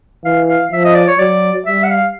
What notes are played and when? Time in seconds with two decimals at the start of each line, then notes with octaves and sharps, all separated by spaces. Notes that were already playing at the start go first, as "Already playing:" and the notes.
0.25 E3 F5
0.49 F5
0.72 F3 E5
0.85 D#5
0.95 D5
1.08 C#5
1.19 F#3 D5
1.66 G3 E5
1.84 F#5
1.90 F5